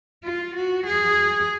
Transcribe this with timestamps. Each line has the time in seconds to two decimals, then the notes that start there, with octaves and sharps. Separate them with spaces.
0.24 F4
0.55 F#4
0.86 G#4